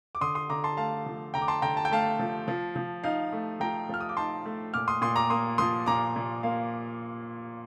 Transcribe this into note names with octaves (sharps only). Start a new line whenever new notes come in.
D6
D3 C6 D#6
C6 D#6
D3 A#5 D6
A5 C6
A3 F5 A5
F3
D3 G5 A#5
D6
A5 C6
D3 G5 A#5
A5
G5
A3 F5 A5
F3
F3
F3
D#4 F5
A3
F3 G5 A#5
F3 F6
D#6
D6
D#4 A5 C6
A3
A#2 D6 F6
C6 D#6
A#2 C6 D#6
A#5 D6
A#3 C6 D#6
F3 C6 D#6
A#2 A#5 D6
A#2
A#3 F5